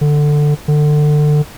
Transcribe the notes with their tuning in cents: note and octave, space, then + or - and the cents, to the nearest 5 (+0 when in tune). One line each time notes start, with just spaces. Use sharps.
D3 +10
D3 +25